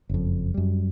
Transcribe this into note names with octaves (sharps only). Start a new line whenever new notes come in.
F#1 F2
F#2 G3